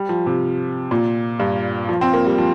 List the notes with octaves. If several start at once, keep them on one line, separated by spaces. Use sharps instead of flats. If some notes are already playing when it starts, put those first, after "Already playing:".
Already playing: G3
F3
C3
A#2
G2
F3
C4
A#3
G3
F3